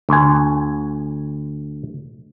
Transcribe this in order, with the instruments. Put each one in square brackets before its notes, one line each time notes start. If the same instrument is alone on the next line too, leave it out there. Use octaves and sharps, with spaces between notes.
[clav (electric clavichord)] D2 G#5